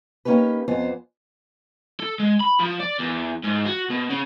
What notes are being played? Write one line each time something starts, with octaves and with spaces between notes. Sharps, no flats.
A#3 C#4 D#4 G4 B4
F2 B3 C5 G#5
A4
G#3
B5
F3
D5
E2
G#2
F#4
B2
C#3